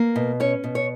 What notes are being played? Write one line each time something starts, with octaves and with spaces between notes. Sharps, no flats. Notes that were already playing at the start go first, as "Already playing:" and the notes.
Already playing: A#3
B2
C#4 C#5
B2
C#5